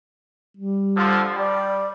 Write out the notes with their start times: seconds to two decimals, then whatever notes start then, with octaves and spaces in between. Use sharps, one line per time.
0.57 G3
0.97 D3 F3
1.35 G3 D5